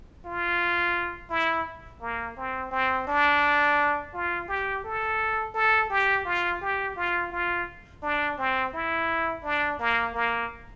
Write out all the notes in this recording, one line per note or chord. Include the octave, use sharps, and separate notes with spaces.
F4
E4
A#3
C4
C4
D4
F4
G4
A4
A4
G4
F4
G4
F4
F4
D4
C4
E4
D4
A#3
A#3